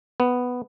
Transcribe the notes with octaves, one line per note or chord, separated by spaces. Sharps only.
B3